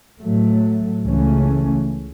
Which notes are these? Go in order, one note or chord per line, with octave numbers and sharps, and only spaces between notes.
A2 F#3 A3
C#2 C#3 E3 A3 C#4